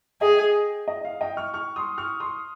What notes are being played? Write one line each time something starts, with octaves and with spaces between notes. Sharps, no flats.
G#4 D#5 G5
D#5
F5
D#5 G5
C#6 F6
C#6 F6
C6 D#6
C#6 F6
C6 D#6